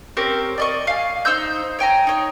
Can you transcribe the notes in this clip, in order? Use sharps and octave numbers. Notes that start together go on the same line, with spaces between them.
C4 C#4 G4 A#4
D5 D#5 C#6
F5 G#5
D#4 C5 E6 G6
C#5 G5 G#5 A#5
D#4 C#5